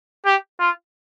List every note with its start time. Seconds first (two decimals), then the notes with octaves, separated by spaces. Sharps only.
0.25 G4
0.60 F4